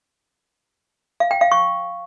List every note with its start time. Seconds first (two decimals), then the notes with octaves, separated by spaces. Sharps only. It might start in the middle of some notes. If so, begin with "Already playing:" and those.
1.20 F5
1.31 G5
1.41 F5
1.52 C#6